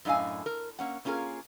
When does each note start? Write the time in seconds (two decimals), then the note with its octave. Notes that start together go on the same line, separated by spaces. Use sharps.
0.05 F#2 A2 D4 D#5 F5 G#5
0.46 A#4
0.79 A#3 C#4 F#5
1.05 A#3 C#4 F4 G#4 A#4